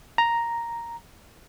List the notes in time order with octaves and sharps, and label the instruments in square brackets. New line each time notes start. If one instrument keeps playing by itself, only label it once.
[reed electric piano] A#5